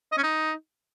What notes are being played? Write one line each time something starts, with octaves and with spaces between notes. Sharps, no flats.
D#5
C#4
D#4